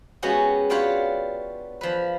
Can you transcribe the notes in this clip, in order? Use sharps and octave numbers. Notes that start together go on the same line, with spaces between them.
G#3 B3 C#4 F#4 G4
D4 F4 G4 B4 C#5 F#5
F3 B4